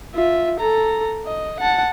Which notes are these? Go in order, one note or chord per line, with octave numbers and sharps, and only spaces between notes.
F4 E5
A4 A#5
D#5
F#5 A5